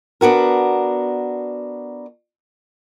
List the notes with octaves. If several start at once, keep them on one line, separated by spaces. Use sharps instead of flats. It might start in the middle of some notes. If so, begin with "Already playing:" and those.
B3 D4 F#4 A#4